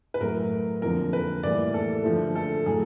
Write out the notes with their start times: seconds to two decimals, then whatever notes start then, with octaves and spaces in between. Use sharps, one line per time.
0.14 B4
0.21 A2 F#3 A3 A#4
0.82 F2 D3 F3 A#3 A#4
1.13 B4
1.43 A2 E3 G3 A#3 D5
1.74 A4
2.04 G2 D3 F3 A3
2.35 A4
2.66 A2 F#3 A3 G#4